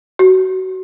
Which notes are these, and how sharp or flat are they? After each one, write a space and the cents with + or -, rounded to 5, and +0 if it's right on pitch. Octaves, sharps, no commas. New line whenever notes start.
F#4 +20